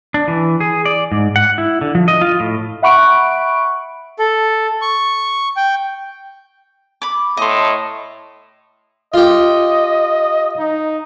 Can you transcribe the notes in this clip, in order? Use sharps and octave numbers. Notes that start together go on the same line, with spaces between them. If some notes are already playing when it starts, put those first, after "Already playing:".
D4
E3
G#4
D5
G#2
F#5
E4
D3
F3
D#5
F4
A2
E5 F#5 B5 C#6 F#6 D7
A4
C#6
G5
B5 D6
A2 D#5 C6
F4 G4 D#5
D#4